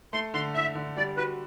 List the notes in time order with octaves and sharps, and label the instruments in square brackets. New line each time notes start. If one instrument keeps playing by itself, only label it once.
[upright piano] A3 [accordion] C6
[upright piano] D3 [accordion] C6
[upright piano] E4 [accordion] E5
[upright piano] D3
[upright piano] G3 [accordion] D5
[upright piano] F#4 [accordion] B4